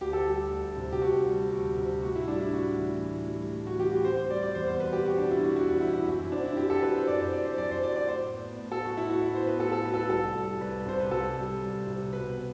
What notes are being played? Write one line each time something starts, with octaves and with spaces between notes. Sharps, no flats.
D2 G4
A4
G3 G4
D2
C3
G4
D2 F#4
G3
D2 F#4
C3
A2 F#4
E4
G3 D4
E4
A2 F#4
E3
A2
G3
A2
F#4
E3 G4
F#4
C4 C5
C5
G3 D5
D5
E2 C5
C5
B2 B4
G4
C4 F#4
D4
G3 E4
F#4
E2 F#4
F#4
B2 E4
E4
F#2 F#4
E4
C4 D4
E4
F#2 G4
A4
F#3 B4
C5
F#2 D5
C5
C4 D5
C5
F#2 D5
C5
F#3 D5
D5
A2 C5
B3
A2
A4
F#3 F#4
E4
A2 F#4
E4
B3 C5
B4
A2 A4
A4
F#3 B4
A4
B4
C2 A4
G3
C2 B4
C3 C5
B4
C2 A4
G3
C2
C3
B2 B4
B3